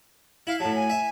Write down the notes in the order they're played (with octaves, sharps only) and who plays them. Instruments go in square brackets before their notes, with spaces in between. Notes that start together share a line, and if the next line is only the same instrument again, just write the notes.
[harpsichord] E4 [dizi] F5
[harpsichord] A2 F#3 [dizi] A5
[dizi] G#5
[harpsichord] E5